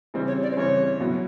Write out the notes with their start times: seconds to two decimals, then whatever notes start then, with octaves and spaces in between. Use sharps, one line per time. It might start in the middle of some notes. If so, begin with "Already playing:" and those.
0.14 C#3 E3 G3 C4
0.28 C#5
0.43 D5
0.52 C5
0.56 C#3 E3 G3 C4 C#5
1.00 B2 F#3 B3 E4